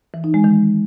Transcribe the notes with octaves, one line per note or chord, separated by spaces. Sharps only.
E3
D#4
G#3
D#3